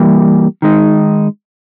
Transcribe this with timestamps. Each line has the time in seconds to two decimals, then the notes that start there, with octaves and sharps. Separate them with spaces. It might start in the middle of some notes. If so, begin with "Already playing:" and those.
Already playing: E3 G3 A#3
0.62 D#3 G#3 D#4